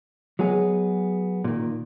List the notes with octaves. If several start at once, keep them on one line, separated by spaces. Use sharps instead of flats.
F#3 G#3 B3 G#4
A#2 D#3